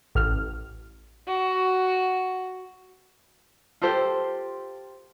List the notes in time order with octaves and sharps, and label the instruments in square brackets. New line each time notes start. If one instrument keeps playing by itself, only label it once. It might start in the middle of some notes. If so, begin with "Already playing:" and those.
[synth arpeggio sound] A1 F6
[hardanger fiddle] F#4
[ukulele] F4 G4 A4 C5